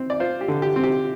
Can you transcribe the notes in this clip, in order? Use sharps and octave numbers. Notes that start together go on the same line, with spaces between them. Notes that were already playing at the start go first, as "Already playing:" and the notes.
Already playing: C4
D5
F4 C5
G4
D3
G4
C4
G4